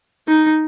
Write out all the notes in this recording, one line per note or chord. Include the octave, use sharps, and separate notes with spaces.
D#4